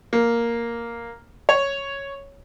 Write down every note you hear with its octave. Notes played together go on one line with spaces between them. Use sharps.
A#3
C#5